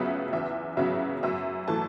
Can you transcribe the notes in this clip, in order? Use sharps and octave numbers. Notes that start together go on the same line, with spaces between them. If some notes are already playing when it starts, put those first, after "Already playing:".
Already playing: C#2 C#3 F#3 B3 E5
E2 E5
C#3 F#3 B3 E5
F#2 E5
E3 A3 A5